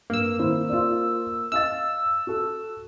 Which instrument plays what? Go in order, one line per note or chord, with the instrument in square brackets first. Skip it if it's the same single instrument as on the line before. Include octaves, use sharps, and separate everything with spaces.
[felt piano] G2 [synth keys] A#3 E6
[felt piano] D#3 E4 C5
F4 C5 D5
[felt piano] D#5 F5 A6 [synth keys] E6
[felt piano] F#4 A4